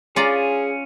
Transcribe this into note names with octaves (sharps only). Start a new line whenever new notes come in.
C#4 F4 G#4 D5 A#5